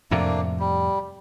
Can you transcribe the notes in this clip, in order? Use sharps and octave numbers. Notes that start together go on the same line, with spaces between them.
F2 A2 C3 A3 A#3 D4
G3